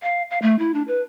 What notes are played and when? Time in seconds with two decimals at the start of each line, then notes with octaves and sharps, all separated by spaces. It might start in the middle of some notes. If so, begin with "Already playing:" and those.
0.02 F5
0.31 F5
0.42 A3
0.59 E4
0.74 D4
0.88 B4